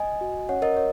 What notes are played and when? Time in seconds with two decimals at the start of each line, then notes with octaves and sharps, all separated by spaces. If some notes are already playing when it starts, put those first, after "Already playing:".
Already playing: D#5 G#5
0.21 F#4
0.49 C#4 C#5 F#5
0.62 A#4 D#5
0.76 F#4 C#5